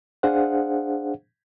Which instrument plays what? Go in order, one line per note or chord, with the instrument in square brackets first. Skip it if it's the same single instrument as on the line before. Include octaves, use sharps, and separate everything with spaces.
[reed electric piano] D4 G#4 C5 F5 F#5